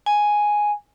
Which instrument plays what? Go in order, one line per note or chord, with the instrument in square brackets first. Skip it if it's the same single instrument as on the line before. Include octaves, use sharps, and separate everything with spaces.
[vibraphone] G#5